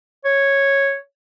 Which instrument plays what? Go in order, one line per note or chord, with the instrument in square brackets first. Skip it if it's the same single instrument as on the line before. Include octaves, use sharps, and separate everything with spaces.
[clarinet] C#5